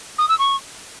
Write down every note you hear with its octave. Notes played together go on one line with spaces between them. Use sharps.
D#6
E6
C#6